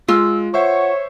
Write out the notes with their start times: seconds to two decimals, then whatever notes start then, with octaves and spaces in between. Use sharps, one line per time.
0.08 G#3 F4 E6
0.54 C5 C#5 E5 F#5 C#6